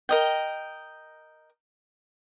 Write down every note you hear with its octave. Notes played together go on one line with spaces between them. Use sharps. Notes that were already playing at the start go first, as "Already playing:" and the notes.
A#4 D#5 G5